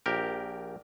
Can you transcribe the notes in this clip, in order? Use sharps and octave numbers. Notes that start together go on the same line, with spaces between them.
A#1 G4 A#4